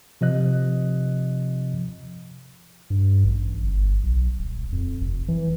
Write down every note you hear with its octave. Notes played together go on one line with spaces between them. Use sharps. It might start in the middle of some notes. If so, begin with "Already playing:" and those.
C3 F3 D#5 F#6
G2
A1
G1
B1
D#1
F2
F1
E3